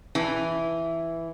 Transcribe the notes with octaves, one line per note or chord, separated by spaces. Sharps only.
E3